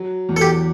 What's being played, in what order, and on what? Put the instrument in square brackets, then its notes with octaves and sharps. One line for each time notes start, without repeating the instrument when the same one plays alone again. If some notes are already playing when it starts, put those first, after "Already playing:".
Already playing: [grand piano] F#3
E2
[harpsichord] A4
G4